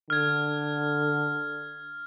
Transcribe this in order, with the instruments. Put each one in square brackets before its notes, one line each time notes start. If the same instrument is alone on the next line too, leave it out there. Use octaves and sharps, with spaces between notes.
[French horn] D3 [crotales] F6 G#6